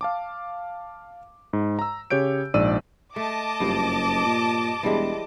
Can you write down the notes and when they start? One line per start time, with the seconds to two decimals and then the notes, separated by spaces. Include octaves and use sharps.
0.01 F5 A5 D6
1.53 G#2
1.79 A#5 E6
2.10 C#3 G4 C#5 G6 D7
2.54 A#1 G#2 D5 E6 D#7
3.16 A3 D#5 A5 D6
3.60 F#1 G2 F3
4.25 A#2
4.83 E1 E3 G3 G#3